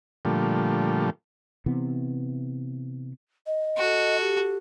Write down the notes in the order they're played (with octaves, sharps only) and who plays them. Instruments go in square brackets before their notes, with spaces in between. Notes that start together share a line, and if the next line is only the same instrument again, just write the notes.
[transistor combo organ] A#2 D3 F3 G3 A3
[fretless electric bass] C3 E3 B3
[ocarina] D#5
[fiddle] F#4 A4
[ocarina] G4